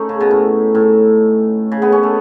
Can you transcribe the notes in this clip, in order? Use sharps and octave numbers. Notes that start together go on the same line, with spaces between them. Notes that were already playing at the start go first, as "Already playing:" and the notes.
Already playing: A3 C#4 D#4
C#3
B2
A2
A2
C#3
B3
C#4
A3